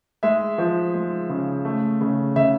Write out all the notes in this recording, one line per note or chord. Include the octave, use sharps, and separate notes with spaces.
G#3 E5
F3
G#3
C#3
A3
C#3
C#3 E5